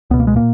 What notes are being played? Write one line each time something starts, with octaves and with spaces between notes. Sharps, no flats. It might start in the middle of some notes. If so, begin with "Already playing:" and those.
C#2 B2 B3
A#3
G#3
A#2 A#3